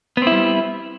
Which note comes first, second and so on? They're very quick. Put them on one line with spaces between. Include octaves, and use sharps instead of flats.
B3 C4 E4 G3